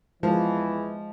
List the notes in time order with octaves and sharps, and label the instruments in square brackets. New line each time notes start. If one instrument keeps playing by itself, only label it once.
[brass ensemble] E2 E3 [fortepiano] F3 [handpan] G#3